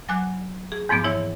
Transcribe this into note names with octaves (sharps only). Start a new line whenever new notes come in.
F#3 G#5 D6 F#6
G#4
E2 G#2 F3 A#3 B3 D6
G#2 E3 E4 C#5